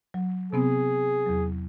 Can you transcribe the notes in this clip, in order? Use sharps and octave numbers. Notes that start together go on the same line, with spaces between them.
F#3
C3 B3 C4 G#4
E2 F#3